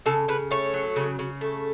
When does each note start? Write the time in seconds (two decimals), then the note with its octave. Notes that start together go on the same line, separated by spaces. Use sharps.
0.06 C#3 A4
0.28 C#3 B4
0.51 A3 C#5
0.74 F#3
0.96 C#3
1.19 C#3
1.41 A3